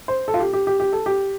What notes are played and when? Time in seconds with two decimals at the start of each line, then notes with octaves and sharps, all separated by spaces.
0.08 C5
0.28 A4
0.34 F4
0.40 G4
0.53 G4
0.67 G4
0.80 G4
0.93 A4
1.06 G4